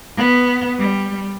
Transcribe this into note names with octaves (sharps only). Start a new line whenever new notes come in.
B3
G3